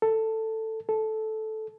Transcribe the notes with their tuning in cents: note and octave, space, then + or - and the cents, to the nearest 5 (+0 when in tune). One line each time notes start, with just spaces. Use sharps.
A4 +10
A4 -10